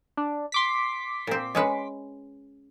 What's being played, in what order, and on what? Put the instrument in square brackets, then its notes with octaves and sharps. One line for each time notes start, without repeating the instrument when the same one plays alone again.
[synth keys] D4
C6 D6 B6
[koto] A#2 C4
G#3 C#4 B4